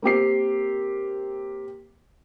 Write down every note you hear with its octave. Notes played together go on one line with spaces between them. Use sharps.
A#3 C4 G4 C7